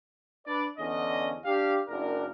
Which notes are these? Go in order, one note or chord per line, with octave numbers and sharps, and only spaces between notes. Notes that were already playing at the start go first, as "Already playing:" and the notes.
D4 B4 D5
E2 D3 C#4 D4 D#5
D4 G4 F5
F#1 D4 A#4